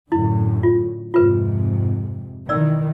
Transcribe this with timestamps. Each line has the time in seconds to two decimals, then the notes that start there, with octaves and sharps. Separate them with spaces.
0.12 F#2 A2 D3 E4
0.63 F4
1.14 F2 G#2 C3 F4 B4
2.49 B2 D#3 E3 D5 E6